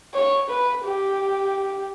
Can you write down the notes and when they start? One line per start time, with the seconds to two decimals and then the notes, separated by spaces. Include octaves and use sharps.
0.14 C#5
0.50 B4
0.85 G4